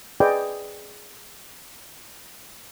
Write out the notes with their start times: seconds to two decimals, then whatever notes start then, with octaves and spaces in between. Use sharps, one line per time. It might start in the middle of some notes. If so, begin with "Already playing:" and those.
0.20 G#4 B4 D5 D#5 G5